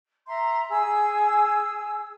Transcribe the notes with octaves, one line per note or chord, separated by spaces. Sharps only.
E5 A#5 C6
G#4 E6